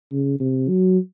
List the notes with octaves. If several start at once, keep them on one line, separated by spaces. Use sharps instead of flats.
C#3
C3
F#3